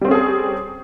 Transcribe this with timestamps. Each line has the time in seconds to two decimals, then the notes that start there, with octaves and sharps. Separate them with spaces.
0.01 G3
0.05 C4
0.08 C#4
0.11 G#4
0.14 A4